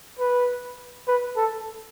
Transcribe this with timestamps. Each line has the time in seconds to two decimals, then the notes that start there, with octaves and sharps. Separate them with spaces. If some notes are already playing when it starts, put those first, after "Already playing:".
0.19 B4
1.08 B4
1.36 A4